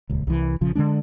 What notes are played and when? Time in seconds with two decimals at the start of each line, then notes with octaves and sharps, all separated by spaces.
0.09 D#1 C#2
0.27 C2 E3
0.61 A#1 C#3 F3
0.75 D3 F#3 G#3 D4